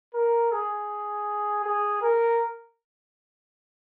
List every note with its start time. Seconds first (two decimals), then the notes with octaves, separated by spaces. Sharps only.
0.14 A#4
0.52 G#4
1.64 G#4
2.02 A#4